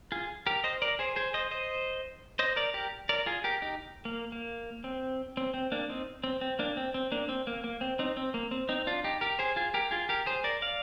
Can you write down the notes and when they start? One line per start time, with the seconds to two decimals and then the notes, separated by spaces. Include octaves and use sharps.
0.12 F4 G#4
0.46 G4 A#4
0.64 C5 D#5
0.82 A#4 D5
0.99 G#4 C5
1.16 G#4 C5
1.34 C5 D#5
1.51 C5 D#5
2.39 C5 D#5
2.56 A#4 D5
2.74 G4 A#4
3.09 A#4 D5
3.26 F4 G#4
3.44 G4 A#4
3.62 D#4 G4
4.05 A#3
4.32 A#3
4.84 C4
5.37 C4
5.54 C4
5.72 A#3 D4
5.89 C4 D#4
6.24 C4
6.41 C4
6.59 A#3 D4
6.77 C4
6.94 C4
7.12 A#3 D4
7.29 C4
7.47 A#3
7.64 A#3
7.81 C4
7.99 C4 D#4
8.17 C4
8.34 A#3
8.51 C4
8.69 C4 D#4
8.87 D4 F4
9.04 D#4 G4
9.21 G4 A#4
9.39 G#4 C5
9.56 F4 G#4
9.74 G4 A#4
9.91 F4 G#4
10.09 G4 A#4
10.26 G#4 C5
10.44 A#4 D5
10.62 D5 F5